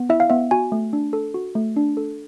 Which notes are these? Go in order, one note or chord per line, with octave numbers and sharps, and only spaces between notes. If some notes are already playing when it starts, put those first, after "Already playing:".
Already playing: B3
E4 E5
F5
B3 E5
F#4 G#5
A3
D4
A4
F#4
A3
D4
A4